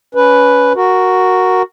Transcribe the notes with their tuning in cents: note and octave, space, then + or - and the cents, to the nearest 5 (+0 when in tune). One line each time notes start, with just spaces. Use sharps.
C#4 +25 B4 +0
F#4 +0 A#4 +0